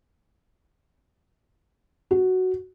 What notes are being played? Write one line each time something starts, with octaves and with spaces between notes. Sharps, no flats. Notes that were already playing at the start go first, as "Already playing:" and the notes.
F#4